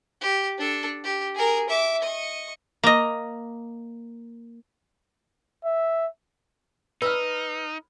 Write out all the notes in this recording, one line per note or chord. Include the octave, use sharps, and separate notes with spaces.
G4
D4 A4
G4
G#4 A#4
E5 D6
D#5 C#6
A#3 D#5
E5
D#4 B4 E6 F6